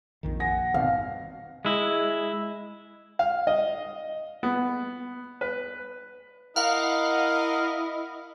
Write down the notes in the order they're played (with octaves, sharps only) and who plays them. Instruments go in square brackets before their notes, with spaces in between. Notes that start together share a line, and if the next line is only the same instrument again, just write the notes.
[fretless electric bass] A#1 F2 D#3
[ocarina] F#5 [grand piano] G#5 A#6
[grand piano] G#1 [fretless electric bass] B2 [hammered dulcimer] F5
[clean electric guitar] G#3 E4
[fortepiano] F5
D#5
B3
B4
[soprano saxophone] E4 [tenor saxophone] A#4 [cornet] D#5 [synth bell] F5 F#5